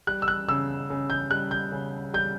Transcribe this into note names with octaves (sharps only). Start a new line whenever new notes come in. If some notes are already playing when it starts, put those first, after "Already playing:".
G3 F#6
E6
F#6
C#3 E6
C#3
G6
G3 F#6
G6
C#3
G3 G6